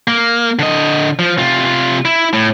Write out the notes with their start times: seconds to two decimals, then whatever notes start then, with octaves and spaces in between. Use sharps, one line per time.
0.08 A#3
0.59 D3 D#5
1.19 F3
1.39 C3 F4
2.05 E4
2.33 A2